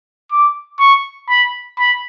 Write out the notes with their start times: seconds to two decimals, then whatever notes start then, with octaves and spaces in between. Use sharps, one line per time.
0.31 D6
0.79 C#6
1.29 B5
1.79 B5